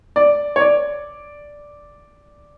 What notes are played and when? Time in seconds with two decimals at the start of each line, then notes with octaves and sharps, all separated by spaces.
0.16 D5
0.56 C#5
0.60 D5